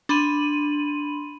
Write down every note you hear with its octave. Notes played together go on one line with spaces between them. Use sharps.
D4 B5 C6 D#7 F#7